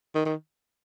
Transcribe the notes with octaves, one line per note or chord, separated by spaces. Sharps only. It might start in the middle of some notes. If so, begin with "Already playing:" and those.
D#3
D#3